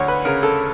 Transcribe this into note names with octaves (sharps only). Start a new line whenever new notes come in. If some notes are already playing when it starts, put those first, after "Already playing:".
Already playing: D2 C#5
B4
C#3 A#4
A4